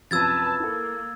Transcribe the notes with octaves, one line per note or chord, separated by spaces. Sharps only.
F#2 C3 F3 B4 A5 E6 G#6 A6
A#3 E4 A4